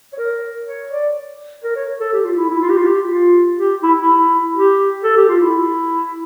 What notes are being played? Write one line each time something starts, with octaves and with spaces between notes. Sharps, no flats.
C#5
A#4
C#5
D5
A#4
C#5
A4
G4
F4
E4
E4
F4
G4
F4
G4
F4
G4
E4
E4
G4
A4
G4
F4
E4